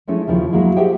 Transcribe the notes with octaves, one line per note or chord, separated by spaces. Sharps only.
F3 G#3 A3 C#4 E4
D#2 C#3 F3 E4
F#3 G#3 A#3 E4
G4 G#4 C5 E5 F#5 G5